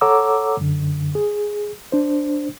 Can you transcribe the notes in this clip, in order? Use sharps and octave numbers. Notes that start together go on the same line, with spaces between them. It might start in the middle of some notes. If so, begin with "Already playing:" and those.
A4 C#5 F#5 A#5 D6 E6
F#2 D3
G#4
D4 C5